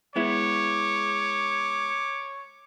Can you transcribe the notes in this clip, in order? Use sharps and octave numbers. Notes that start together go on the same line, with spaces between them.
G#3 B3 E4 C#5 D6